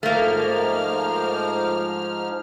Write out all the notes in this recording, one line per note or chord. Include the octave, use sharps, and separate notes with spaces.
G#2 F3 A3 A#3 F6